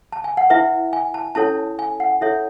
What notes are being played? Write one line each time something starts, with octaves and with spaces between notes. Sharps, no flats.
A5
G#5
F#5
E4 B4 E5
G#5
A5
C#4 E4 A4 C#5 A5
G#5
F#5
E4 A4 C#5 E5